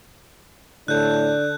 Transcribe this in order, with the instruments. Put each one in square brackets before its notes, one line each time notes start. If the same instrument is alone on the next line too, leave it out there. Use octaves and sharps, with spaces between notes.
[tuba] A2 [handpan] D3 A4 [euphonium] D4 [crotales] F#6 G6